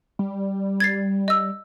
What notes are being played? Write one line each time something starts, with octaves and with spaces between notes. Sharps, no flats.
G3
G#6 A6 C7
D#5 E6